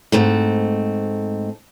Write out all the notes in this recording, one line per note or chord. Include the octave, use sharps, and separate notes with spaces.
G#2 A3 C4